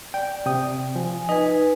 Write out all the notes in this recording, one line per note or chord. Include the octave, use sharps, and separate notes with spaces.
D5 G5
C3 G5 D#6
F3 G#5
D#4 B4 D#5 G#5